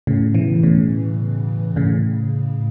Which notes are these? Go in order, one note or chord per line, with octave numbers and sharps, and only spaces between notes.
A2 C#3
B2 E3
A2 C#3
A2 C#3